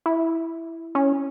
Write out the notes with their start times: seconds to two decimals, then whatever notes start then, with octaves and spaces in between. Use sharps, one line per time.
0.06 E4
0.95 C#4